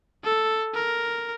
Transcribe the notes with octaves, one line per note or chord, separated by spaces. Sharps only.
A4
A#4